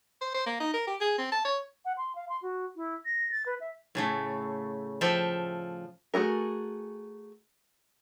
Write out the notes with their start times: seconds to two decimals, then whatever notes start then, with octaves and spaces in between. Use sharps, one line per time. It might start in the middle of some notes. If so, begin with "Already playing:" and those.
0.22 C5
0.34 C5
0.46 A#3
0.60 D#4
0.74 A#4
0.87 G4
1.01 G#4
1.18 C4
1.32 A5
1.45 C#5
1.85 F#5
1.97 C6
2.15 F5
2.29 C6
2.42 F#4
2.76 E4
3.05 A#6
3.31 A6
3.46 B4
3.61 E5
3.95 A2 C#3 A3
5.01 F3 A4 E5 G5
6.14 A3 F#4 G#4 A#4